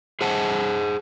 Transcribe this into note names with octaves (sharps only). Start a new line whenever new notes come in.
G#4 C5 F#5 A5